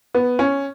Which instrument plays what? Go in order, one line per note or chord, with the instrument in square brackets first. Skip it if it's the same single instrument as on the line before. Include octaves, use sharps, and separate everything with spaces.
[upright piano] B3
C#4